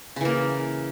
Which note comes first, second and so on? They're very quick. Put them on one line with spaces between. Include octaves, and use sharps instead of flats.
C#3 E3 A#3